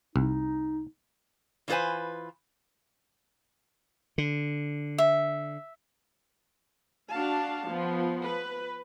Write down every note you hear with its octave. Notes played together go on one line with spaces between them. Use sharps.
C2 D#4
E3 C#4 F4 B4 C5 G#5
D3
E5
D4 F#4 F5 A5
F3 B3
B4